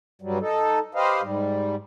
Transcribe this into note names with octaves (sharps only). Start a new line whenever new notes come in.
G2 F#3 G3
D#4 A4
G4 B4 C5 D#5 F5
G#2 G3